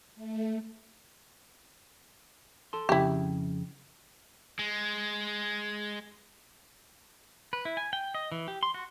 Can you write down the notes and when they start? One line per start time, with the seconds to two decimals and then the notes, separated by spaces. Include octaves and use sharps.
0.15 A3
2.73 A4 A5 C6
2.89 F2 C#3 E4 G4
4.59 G#3
7.53 B4
7.65 E4
7.77 G#5
7.93 G5
8.15 D#5
8.32 E3
8.48 G4
8.63 C6
8.74 F#4